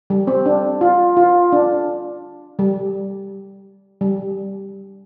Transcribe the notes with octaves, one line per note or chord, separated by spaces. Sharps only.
G3
C4
D4
F4
F4
D4
G3
G3